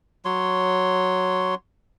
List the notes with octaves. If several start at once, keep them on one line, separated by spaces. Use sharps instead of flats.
F#3 C#5 C6